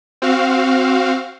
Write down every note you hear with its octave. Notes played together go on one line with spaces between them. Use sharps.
C4 F#4 F5